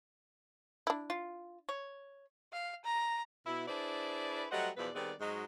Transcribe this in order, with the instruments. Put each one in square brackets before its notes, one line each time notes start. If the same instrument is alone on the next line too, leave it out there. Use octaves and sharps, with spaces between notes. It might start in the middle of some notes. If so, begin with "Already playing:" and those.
[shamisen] D4 E4
[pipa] F4
C#5
[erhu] F5
A#5
[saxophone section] B2 E4
D4 E4 G#4 B4 C5 D5
F#3 G3 A3 C5 D#5 F#5
E2 B2 F3 E4 B4 D5
D#3 G3 B3 C4 G#4 D5
G#2 F#3 G#3 F#4 G#4 D#5